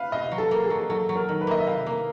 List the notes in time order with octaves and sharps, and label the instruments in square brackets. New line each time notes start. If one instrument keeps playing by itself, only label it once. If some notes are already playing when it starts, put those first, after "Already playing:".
Already playing: [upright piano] B4 F5
[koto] C3 [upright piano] D#5
[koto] F#3
[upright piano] A4
[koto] A#3
[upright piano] G#4
[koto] F#3
[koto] F#3 [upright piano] A4
[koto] F#3
[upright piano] A#4
[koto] D#3
[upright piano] B4
[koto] A#3 [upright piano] D#5
[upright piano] E5
[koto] C3 [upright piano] F5
[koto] A#3